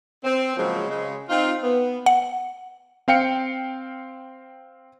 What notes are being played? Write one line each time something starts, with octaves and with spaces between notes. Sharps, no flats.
C4
C#3 F3 F#3 G#3 A#3 C4
C#3 G#3
C4 D#4 F4
B3
F#5
C4 F5 G5 C#7